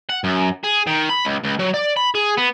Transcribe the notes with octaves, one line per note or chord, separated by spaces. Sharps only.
F#5
F#2
G#4
D#3
B5
C#2
C#2
F#3
D5
B5
G#4
B3